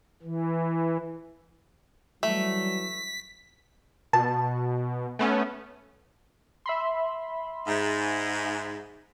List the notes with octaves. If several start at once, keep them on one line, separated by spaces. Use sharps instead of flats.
E3
E3 F#3 G3 A3 B6
B2 A5
A3 B3 C#4
E5 B5 C6
G#2